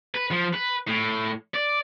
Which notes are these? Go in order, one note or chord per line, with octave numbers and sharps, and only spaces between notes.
B4
F3
B4
A2
D5